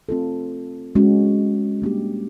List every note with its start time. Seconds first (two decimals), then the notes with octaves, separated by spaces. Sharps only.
0.09 A3 C4 F4 A4
0.95 G#3 C#4 F#4
1.82 G3 A#3 D4 G4